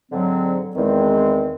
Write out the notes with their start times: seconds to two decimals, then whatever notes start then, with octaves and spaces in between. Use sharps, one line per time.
0.11 G#2 D3 F#3 C4
0.76 E2 D#3 G#3 C4